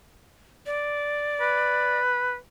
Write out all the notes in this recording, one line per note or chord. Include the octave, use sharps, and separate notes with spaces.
D5
B4